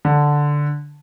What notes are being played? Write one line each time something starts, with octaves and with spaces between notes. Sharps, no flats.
D3